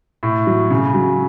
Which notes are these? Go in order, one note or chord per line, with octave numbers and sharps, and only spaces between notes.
A2
F#3
C#3
F#3